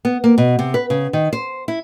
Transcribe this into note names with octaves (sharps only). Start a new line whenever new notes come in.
B3
A#3
B2
C3
B4
C#3
D#3
C5
E4